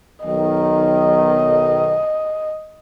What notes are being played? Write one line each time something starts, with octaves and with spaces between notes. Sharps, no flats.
B1 D#3 D#5